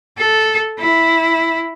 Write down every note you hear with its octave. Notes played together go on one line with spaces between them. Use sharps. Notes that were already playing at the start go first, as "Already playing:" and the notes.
A4
E4